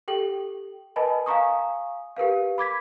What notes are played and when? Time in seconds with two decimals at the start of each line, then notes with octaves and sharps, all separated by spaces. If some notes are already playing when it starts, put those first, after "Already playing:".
0.08 G4 A4 G5 F#7
0.96 A#4 B4 D#5 G#5 A5 B5
1.26 F5 G#5 A#5 C#6 D#6
2.17 G4 A#4 B4 F5
2.58 B5 D6 G#6 B6